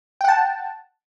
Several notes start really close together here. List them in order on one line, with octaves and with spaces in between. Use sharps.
G5 F#5 A5